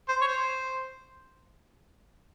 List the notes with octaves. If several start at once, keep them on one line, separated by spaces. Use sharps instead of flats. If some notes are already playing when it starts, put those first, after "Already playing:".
C5
C#5
C5